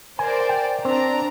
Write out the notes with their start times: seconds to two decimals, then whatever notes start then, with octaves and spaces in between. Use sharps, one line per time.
0.19 A#4 C5 D5 G#5
0.49 G5
0.85 C4 D4 A#5